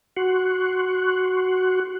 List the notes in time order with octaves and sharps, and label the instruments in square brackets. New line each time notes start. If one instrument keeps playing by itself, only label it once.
[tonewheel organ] F#4 C6 C#6 F#6